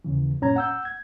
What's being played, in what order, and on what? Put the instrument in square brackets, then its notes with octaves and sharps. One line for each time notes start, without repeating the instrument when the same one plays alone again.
[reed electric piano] D#2 C#3 E3
F#2 A#2 C#4 A#5 G#6
F#5 E6 G6
G#6